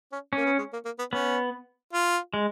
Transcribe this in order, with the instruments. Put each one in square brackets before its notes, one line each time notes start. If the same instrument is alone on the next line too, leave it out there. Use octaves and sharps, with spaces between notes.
[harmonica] C#4
[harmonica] A#3 [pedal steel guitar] C#4
[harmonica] B3
G#3
A#3
A#3
B3
[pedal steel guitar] B3 [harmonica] C#4
[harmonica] F4
[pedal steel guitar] G#3